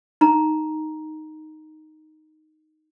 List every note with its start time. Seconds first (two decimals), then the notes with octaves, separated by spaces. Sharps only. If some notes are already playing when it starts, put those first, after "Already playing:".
0.21 D#4 A#5